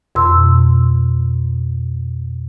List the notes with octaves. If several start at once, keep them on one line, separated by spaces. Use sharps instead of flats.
F2 B2 C6 E6